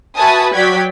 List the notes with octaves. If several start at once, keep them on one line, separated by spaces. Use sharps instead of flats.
F#4 B4 E5 G#5 A5 D#6
F#3 D5 G5 G#6 B6